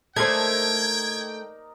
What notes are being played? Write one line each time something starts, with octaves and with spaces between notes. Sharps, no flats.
A3 D#4 A#4 C5 D5 G5 G#6